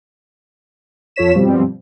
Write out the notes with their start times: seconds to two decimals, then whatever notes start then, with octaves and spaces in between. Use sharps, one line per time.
1.16 F2 F4 A4 C#5 B6 E7
1.35 G2 B2 F3 G3 C4